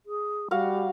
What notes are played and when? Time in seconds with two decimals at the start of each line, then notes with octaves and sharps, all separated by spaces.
0.06 G#4
0.51 G3 F#4 F5 F#5